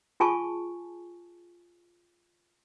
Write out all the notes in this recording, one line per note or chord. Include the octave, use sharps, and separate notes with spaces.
F4 G#4 G#5 A5 C#6